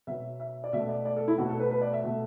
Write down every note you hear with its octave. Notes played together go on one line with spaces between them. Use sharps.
B2 F#3 B3 E5
E5
D5
B2 A3 E5
D5
D5
A4
E4
B2 F#3 A3 F#4
A4
B4
B4
D5
E5
B2 A3